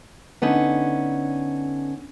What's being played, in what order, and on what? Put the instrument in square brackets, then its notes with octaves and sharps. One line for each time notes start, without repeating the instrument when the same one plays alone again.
[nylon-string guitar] D3 B3 C#4 D#4